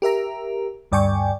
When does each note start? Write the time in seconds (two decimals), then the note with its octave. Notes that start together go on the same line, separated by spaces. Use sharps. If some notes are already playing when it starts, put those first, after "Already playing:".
0.02 G4 A#4 E5 A#5
0.92 D2 G2 D5 G5 G#5 C#6